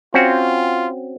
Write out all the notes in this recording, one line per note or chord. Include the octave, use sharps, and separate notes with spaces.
C4 C#4 F4 F#4